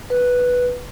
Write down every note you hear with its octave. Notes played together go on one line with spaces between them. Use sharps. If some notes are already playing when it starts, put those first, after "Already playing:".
B4